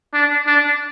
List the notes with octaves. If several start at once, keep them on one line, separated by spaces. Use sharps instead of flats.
D4
D4